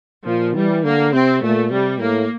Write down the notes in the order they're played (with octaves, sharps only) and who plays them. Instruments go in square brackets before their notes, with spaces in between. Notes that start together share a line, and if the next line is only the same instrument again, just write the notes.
[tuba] A#2 [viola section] F3
[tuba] E3 [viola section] G3
[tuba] D3 [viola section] A#3
[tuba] C3 [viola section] C4
[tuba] A#2 [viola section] A3
[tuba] C3 [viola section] G3
[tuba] A2 [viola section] A#3